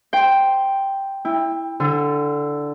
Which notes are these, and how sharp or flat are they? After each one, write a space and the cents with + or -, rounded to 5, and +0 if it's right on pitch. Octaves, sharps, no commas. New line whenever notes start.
G5 +0 C6 +0
E4 +0 G5 +25
D3 +0 E6 +45